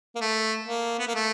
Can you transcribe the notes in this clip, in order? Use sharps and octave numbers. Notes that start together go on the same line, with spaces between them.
A#3
A3
A#3
B3
A#3
A3